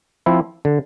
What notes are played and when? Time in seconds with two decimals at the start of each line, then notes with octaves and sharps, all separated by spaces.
0.26 F3 C4 E4
0.65 D3